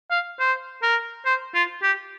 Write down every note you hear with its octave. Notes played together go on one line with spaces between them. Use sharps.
F5
C5
A#4
C5
F4
G4